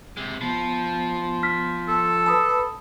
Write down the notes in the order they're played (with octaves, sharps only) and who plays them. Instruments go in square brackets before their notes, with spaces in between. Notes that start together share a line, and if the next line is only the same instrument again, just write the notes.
[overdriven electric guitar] C3 G#3
[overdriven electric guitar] F3 [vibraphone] B3
[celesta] F6 B6
[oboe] A4
[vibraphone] B4 B5 [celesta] A5 D#6